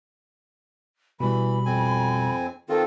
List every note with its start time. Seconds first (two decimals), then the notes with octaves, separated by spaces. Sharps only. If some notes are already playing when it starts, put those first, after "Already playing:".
1.20 B2 E3 G3 B5
1.66 F2 C4 G#5
2.69 D#3 C4 F4 A4